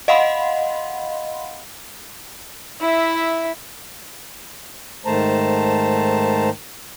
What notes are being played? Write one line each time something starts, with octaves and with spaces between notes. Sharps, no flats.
D#5 F5 F#5 B5 C6
E4 E5
G#2 D#3 A3 C5 A5 A#5